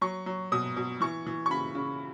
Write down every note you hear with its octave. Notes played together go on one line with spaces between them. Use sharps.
F#3 C#6
F#3
B2 D#6
B2
E3 C#6
E3
C#6
C#3 B5
C#3